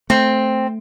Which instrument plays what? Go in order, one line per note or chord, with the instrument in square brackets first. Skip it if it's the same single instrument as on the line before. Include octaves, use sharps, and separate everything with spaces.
[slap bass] A3 [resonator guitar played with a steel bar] C4